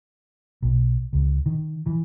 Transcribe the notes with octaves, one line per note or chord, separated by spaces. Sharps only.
B1
C#2
D#3
E3